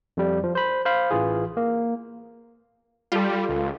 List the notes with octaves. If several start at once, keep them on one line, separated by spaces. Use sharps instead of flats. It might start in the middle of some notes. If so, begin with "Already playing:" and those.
F2 G3
F3
C5 B5
C5 F5 B5
A1 E3 F4 G#4
A#3
G3 F4 A4
C#2